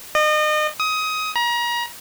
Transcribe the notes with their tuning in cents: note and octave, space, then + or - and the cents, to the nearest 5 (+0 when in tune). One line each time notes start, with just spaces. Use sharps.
D#5 -35
D#6 +20
A#5 +35